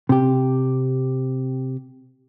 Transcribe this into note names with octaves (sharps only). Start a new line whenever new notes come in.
C3 G4